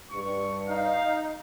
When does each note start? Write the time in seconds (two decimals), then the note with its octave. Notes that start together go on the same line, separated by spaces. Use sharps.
0.11 G2 C#6
0.68 D#4 F5